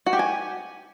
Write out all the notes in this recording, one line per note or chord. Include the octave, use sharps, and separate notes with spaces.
F#4
G4
G#5